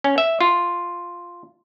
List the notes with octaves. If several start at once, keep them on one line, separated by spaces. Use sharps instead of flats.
C#4
E5
F4